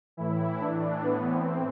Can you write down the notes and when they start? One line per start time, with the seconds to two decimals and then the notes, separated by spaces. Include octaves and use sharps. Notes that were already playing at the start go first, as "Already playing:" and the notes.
0.17 A2 E3 E4
0.60 D4
1.04 B3
1.32 C4